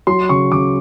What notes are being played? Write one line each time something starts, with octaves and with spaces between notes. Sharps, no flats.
F#3 C6
C#3 C#6
C#3 D6